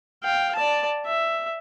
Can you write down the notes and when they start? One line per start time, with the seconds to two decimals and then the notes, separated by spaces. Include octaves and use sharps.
0.23 F5 G5
0.55 D5 A5
1.06 E5